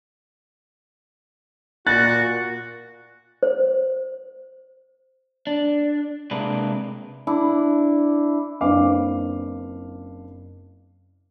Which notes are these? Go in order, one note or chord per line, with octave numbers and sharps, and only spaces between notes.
A#2 F#4 F#6 A6
C5
D4
C3 G#3 A#3 D4 B4
D4 E4
F#1 C4 D4 B4 F5 D6